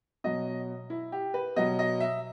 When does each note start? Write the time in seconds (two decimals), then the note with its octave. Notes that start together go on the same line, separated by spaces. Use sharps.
0.24 B2 F#3 D#5
0.90 E4
1.12 G4
1.34 B4
1.56 B2 F#3 D#5
1.79 D#5
2.00 E5